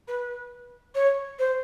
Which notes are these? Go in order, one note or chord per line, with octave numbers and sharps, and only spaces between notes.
B4
C#5
C5